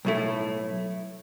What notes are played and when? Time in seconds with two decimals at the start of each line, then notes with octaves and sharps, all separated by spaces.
0.05 B1 A2 A3 E4